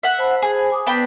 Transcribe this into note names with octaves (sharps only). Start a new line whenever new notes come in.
E5 F#5
C5 A5 B5
G#4
G#5 D6 D#6
B3 D4 B4 G5 B5